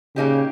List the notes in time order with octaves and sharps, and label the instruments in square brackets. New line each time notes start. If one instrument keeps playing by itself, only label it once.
[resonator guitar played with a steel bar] A#2 A#3 D#4 G4 [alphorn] C#3